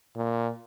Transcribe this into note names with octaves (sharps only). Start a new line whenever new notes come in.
A#2